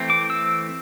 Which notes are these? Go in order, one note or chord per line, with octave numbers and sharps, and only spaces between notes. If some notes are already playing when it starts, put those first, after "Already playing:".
Already playing: E3 A3 C4
D6
E6